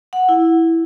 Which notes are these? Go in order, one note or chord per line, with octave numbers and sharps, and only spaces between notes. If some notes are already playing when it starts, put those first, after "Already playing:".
F#5
E4